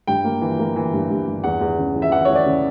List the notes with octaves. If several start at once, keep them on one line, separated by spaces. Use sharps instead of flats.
G2 G5
A#3
E3
A#3
E3
G2
G2
G2
E2 F#5
E2
C#3
E3
E5
E3 F#5
E3 C#5
D5
C#3